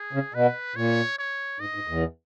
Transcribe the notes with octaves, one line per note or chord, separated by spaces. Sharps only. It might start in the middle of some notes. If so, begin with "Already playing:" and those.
Already playing: G#4
C#3
B2 B4
A#2 C#5
C#5
G#2 D#5
G#2
E2